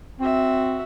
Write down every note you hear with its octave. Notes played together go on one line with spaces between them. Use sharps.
C4 F#4 E5